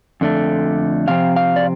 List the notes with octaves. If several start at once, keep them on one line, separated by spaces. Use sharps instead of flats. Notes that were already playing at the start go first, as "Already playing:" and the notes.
F2 D3 A3
C3 F3 C4 F5
F5
D5